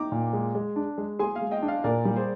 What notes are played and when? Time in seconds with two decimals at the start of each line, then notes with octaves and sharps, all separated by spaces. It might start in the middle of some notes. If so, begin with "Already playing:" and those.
Already playing: D#4 G5 A#5 D6
0.12 A#2
0.33 G#3
0.55 G#3
0.76 D4
0.98 G#3
1.19 G#4 G#5 C6
1.35 F5 G#5
1.42 G#3
1.51 D#5 G5
1.62 D4
1.68 D5 F5
1.84 A#2 A#4 D5
2.05 G3
2.16 G#4 C5